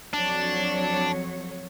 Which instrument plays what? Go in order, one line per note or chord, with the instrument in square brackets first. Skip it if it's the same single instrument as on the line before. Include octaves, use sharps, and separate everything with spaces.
[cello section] F2 F#3 C#5 [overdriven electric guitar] D4